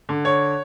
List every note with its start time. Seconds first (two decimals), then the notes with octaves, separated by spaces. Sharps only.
0.09 D3
0.25 C#5